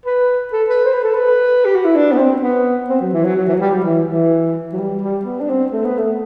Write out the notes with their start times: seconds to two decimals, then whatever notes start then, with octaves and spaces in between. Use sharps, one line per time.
0.06 B4
0.53 A4
0.69 B4
0.85 C5
0.94 B4
1.03 A4
1.14 B4
1.65 G4
1.75 F#4
1.85 E4
1.95 D4
2.12 B3
2.18 C4
2.42 B3
2.89 C4
3.01 F#3
3.13 E3
3.24 F#3
3.36 F#3
3.48 E3
3.54 F#3
3.60 G3
3.72 F#3
3.84 E3
4.07 E3
4.73 F#3
4.78 G3
5.02 G3
5.25 B3
5.41 D4
5.49 C4
5.72 A3
5.85 B3
5.98 A3